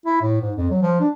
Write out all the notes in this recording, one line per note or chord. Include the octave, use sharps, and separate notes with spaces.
E4
A2
G#2
F2
F#3
F3
D4